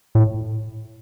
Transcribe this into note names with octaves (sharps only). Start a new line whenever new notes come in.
A2